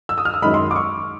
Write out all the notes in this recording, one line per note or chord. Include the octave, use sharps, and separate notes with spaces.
E6
D#6
F6
E6
F#2 D#3 G#3 B5
C6
D6
C#6